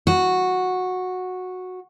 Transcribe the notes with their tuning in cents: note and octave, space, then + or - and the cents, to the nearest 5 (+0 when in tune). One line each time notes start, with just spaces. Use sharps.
F#4 -10